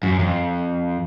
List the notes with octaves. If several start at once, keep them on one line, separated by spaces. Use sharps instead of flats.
F#2
F2